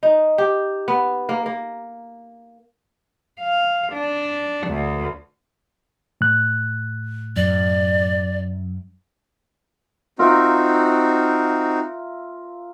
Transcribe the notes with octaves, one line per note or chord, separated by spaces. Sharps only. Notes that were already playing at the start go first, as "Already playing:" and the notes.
D#4
G4
B3
A#3
A#3
F5
D4
D2
A2 F#6
F#2 D5
C4 D#4 F4 F#4 A#4 E5